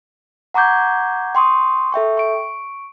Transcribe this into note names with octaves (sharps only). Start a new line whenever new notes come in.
F#5 A#5 C#6 D6 G6 G#6
G5 C6 C#6 D#6
A4 E5 G5 C#6
C#6 D7